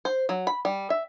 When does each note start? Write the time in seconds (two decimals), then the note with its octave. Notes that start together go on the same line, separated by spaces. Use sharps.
0.05 C5
0.29 F#3
0.47 B5
0.65 G3
0.90 E5